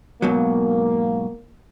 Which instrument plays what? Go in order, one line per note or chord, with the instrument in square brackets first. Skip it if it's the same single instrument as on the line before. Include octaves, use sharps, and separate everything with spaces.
[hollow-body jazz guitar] G#2 B2 F#3 [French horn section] A#3